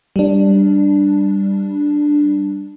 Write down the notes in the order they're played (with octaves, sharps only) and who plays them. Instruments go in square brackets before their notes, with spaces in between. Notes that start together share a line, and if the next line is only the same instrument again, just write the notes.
[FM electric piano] G3 D4